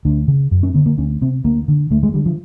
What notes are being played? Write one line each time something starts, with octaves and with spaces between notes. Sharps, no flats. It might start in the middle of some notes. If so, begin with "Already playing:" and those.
D2 D4
C#3
F#2
C#4
D3 B3
A#3
D2 C#4
C3 C4
D2 A#3
D3
D2 A3
G#3
D3 G3
F3